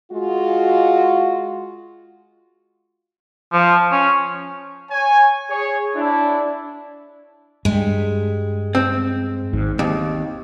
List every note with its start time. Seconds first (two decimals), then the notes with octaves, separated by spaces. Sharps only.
0.11 G#3 F4 F#4
3.53 F3
3.92 C#4
4.91 C#5 G#5
5.50 G#4 C#5
5.95 D4 E4
7.65 G2 G3 G#3
8.75 C4
9.53 G#1 G#2
9.79 D#2 C4